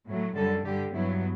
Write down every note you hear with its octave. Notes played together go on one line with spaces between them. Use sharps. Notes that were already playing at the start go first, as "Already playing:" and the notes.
A2 F#3 A3
F#2 D3 G3 A4
G2 D3 G3 G4
G2 F#3 B3 E4